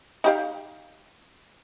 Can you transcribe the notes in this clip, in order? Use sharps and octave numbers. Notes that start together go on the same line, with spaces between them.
D#4 G4 F5